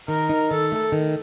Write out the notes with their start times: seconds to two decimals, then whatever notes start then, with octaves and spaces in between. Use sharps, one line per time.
0.08 D#3 A#4
0.29 D#4
0.51 D#3 A4
0.72 A3
0.92 D#3